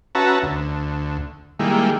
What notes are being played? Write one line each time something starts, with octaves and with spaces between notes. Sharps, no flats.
C#4 F#4 B4 E5 A5 A#5
D2
D#3 G3 G#3 A#3 E4